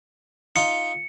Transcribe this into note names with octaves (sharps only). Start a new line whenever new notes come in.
D#4 F4 C#7